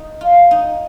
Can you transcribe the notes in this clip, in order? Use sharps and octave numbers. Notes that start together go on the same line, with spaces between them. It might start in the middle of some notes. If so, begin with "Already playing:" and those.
Already playing: D#4
F4
D#4